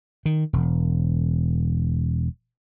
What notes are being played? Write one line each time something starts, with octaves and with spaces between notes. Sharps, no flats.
D#3
E1